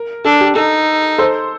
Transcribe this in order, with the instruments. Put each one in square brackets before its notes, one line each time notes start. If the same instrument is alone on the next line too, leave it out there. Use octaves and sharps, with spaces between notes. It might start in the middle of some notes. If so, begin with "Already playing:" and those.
Already playing: [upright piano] A#4
[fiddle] D4 [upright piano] A4
[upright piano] G4
[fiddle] D#4 [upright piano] A4
[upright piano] A4 C5